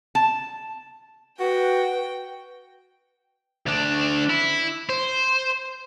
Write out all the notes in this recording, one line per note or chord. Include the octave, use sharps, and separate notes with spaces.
A5
F#4 B4 G5
D2 D4
E4
C5